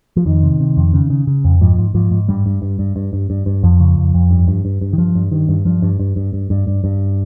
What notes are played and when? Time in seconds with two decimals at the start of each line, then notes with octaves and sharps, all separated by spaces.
0.17 F3
0.26 F2 D#3
0.43 C3
0.60 C3
0.77 F2
0.94 C#3
1.10 C#3
1.27 C#3
1.44 F2
1.61 G#2 F3
1.78 G#2
1.94 G#2 F3
2.11 G#2
2.29 G2 G3
2.46 G2
2.62 G2
2.79 G2
2.96 G2
3.13 G2
3.30 G2
3.46 G2
3.63 F2 F3
3.80 C#3
3.97 F2
4.14 F2
4.31 G2
4.48 G2
4.65 G2
4.81 G2
4.93 D#3
4.98 G2 F3
5.15 G2
5.32 G2 D#3
5.49 G2
5.65 G2 F3
5.82 G2
6.00 G2
6.16 G2
6.33 G2
6.50 G2
6.67 G2
6.84 G2